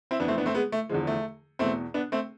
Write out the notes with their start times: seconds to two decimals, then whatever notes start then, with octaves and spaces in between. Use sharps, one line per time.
0.11 C4 E4
0.20 F2 E3 B3 D4
0.28 A3 C4
0.38 B3 D4
0.46 A3 C4
0.55 G#3 B3
0.72 A3
0.89 E2 D3 F3 G#3
1.07 A3
1.59 E2 B2 A3 C4
1.94 B3 D4
2.12 A3 C4